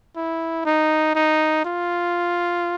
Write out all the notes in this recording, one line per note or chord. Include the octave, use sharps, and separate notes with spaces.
E4
D#4
D#4
F4